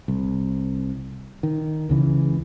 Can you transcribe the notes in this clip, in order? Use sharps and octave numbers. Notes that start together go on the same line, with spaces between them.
C2
D#3
C#2 C#3 E3